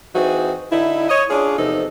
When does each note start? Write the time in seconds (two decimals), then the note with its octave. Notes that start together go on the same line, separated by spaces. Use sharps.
0.15 E3 C4 D#4 F#4 G#4
0.71 D3 D#4 E4
1.09 C#5 D#5
1.29 C#4 D4 F4 G#4
1.57 E2 C3 F3 D#4 A4